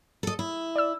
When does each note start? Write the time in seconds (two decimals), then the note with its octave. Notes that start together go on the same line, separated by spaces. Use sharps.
0.23 A4 D#5
0.39 E4
0.76 D5 E6